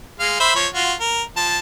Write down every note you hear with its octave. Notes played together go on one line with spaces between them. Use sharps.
G#3 F5
C5 E5 B5
F3 C#5
F4 F#4
A#4
F3 A5